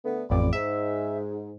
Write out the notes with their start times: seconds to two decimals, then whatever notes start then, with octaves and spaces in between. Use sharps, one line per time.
0.05 D3 A3 B3
0.30 A1 F2 D5 B5 D6
0.53 G#2 E5